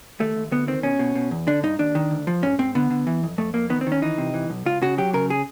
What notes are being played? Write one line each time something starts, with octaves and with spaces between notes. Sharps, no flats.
D#2 A3
D#2
D2 B3
D#3 C4
B2 C#4
B2
B2
E2
D3 D4
G2 D#4
D#2 D4
D#3
D2
F3
G#2 C#4
G#2 C4
D3 B3
D3
E3
F2
F2 A3
F2 A#3
D#3 B3
C4
D#3
C#4
E3 D#4
C3
E3
B1
C#2 F4
C#3 F#4
F#3 G4
C#3 A#4
G#4